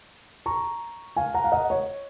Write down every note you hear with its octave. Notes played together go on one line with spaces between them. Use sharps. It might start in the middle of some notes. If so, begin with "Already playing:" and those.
A#5 C#6
F5 G#5
F#5 A#5
F5
D#5 F#5
C#5